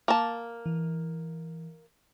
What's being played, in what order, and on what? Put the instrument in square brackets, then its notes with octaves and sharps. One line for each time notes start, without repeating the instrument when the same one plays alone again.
[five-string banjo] A#3 A5
[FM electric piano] E3